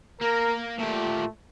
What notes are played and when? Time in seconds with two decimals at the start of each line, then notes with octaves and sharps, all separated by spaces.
0.21 A#3 A#4
0.79 A#2 A3 G4